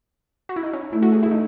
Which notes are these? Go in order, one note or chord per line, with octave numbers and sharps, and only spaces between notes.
F#4
E4
D#4
C#4
A3 E4
F#4
G#4
E4
D#4